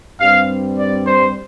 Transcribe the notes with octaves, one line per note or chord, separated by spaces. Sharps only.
G2 G3 C4 F5
D5
C5